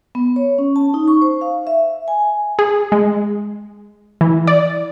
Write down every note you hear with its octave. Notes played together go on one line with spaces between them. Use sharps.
B3
C#5
C#4
A5
D#4
C#6
C5
F5
E5
G#5
G#4
G#3
E3
D5